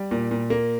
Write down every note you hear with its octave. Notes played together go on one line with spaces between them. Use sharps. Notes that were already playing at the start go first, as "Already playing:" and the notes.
Already playing: G3
A#2
A#2
A#3